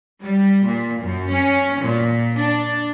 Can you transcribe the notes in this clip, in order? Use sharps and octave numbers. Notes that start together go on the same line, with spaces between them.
G3
A#2
F#2
C#4
A#2
D4